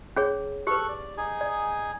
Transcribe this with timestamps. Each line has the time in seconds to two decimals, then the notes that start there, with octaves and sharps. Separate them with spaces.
0.16 C#4 G#4 C#5
0.67 G4 A4 B4 C#6 F#6
0.89 D5
1.18 D#4 G#4 G#5
1.41 D5